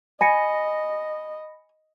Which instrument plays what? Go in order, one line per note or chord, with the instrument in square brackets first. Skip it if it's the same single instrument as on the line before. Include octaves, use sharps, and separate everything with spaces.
[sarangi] D#5 [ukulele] G#5 [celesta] B5 A#6 C#7